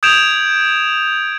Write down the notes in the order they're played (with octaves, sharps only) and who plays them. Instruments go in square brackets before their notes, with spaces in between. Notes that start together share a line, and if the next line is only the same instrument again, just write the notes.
[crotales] D#6 G6 G#6 D7 E7 F7